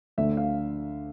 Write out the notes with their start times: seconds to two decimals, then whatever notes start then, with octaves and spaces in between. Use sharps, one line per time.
0.18 D2 D3 A3 E5
0.37 F5